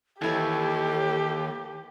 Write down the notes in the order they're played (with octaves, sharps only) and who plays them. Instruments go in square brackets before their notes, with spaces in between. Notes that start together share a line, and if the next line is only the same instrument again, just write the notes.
[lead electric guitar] D#2 [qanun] E3 E4 C#5 [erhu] G4 [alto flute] A4